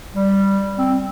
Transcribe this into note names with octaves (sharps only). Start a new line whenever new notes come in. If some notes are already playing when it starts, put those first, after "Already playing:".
G3
C4